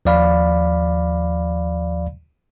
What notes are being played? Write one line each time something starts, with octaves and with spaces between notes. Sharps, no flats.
D#2 F3 D5 F5 B5